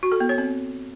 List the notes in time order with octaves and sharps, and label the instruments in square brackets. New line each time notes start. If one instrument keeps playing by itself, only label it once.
[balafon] F#4
A4
B3
C#5
C4